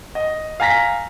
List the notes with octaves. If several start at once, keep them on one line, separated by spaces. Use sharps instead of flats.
D#5
F5 G#5 A#5 A#6 B6